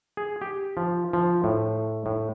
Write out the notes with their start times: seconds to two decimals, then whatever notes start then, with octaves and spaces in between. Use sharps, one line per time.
0.17 G#4
0.41 G4
0.77 F3
1.13 F3
1.44 A2
2.06 A2